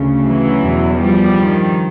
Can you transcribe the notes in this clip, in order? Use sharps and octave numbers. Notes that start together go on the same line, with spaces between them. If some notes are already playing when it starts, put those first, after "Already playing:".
Already playing: D2 C#3
E3 F#3
E2 B2
F3 G3
G2 D#3